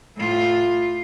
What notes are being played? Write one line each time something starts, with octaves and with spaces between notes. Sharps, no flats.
A2 F4